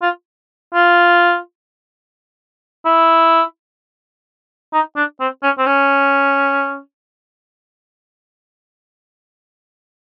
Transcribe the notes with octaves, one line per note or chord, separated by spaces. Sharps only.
F4
F4
E4
D#4
D4
C4
C#4
C4
C#4